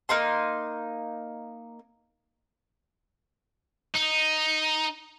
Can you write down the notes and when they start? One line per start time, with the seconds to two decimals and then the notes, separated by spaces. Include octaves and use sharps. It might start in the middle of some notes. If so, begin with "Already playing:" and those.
0.09 A#3 D#4 C6
3.95 D#4